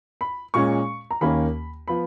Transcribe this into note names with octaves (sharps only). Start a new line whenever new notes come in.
B5
A#2 G#3 C#4 C#6
A#5
D#2 D#3 A#3 C#4 B5
F3 B3 B5